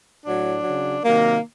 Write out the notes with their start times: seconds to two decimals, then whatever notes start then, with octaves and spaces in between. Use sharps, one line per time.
0.24 A2 F#3 D4
0.64 C#3 F#3
1.04 C3 D#3 F#3 A#3